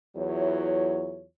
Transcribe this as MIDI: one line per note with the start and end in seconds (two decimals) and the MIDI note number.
0.16 1.26 40
0.16 1.26 54
0.16 1.26 64
0.16 1.26 65
0.16 1.26 73